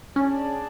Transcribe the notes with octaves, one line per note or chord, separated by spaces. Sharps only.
C#4 D4 G#4 D5 A5